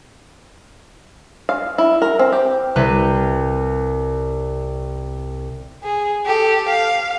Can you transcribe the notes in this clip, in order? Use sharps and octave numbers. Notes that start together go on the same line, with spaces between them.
F5
E4
A#4
C4
G4
C2 B4 G5 D#7
G#4
G4 A4
F5